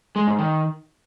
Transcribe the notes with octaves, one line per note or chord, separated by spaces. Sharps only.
G#3
G#2
D#3